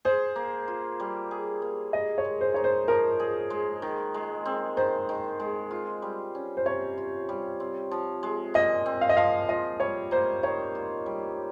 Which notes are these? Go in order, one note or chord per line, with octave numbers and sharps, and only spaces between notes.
G#4 C5
A#3
F4
G3
G#4
A#3
G#4 D#5
C#5
G#3
C5
D#4 C#5
C5
F3 A#4
G#4
G#3
D#3
G#3
C4
D#3 C5
D#3
G#3
F4
G3
C#4
C5
C3 C#5
F4
G3
C4
F3
G#3
A#2 D#5
C4
F5
D#5
F3 F5
F4 D#5
G3 C#5
A#3 C5
D#3 C#5
F4
G3